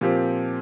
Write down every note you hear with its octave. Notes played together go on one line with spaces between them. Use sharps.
A#2 F3 C4 G4